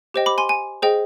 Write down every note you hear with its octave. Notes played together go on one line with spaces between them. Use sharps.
G4 C5 D#5 G5
B5 D6
G#5 C6
G#5
G#4 C5 D#5 G5